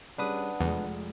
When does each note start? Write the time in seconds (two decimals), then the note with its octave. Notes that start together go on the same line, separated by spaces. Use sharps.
0.18 G3 C#4 D4 G#4 B4 F#5 D#6
0.61 F1 E2 G#3